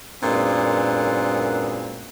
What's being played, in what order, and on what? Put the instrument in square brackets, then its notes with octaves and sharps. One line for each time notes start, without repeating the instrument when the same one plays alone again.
[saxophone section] F#2 A#2 G#3 B3 C4 D4